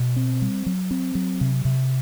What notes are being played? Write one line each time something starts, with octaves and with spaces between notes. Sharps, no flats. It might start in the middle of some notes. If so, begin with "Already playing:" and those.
Already playing: B2
C4
G3
F#3
C4
F#3
C3
C3